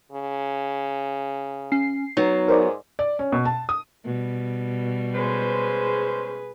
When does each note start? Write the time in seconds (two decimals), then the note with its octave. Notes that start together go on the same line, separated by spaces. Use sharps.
0.12 C#3
1.72 C#4 C7
2.17 F#3 B3 D#4
2.48 G#2 A#4 C5 D5
2.99 D5
3.19 C#4
3.32 B2
3.45 A5
3.69 D#6
4.05 B2 G3
5.14 G#3 C#4 G#4 B4 C5